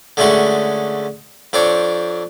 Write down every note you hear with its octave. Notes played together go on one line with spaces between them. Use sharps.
D3 G#3 A3 C#4 F#4 G#4
F2 C4 D4 C5 C#5